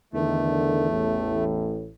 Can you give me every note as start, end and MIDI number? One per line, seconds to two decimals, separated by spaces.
0.14 1.77 40
0.14 0.89 50
0.14 0.89 51
0.14 1.44 57
0.89 1.90 33
0.89 1.90 45